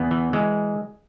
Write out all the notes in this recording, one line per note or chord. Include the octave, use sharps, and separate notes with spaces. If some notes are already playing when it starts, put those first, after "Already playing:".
Already playing: E2 B3
E3
E3 G#3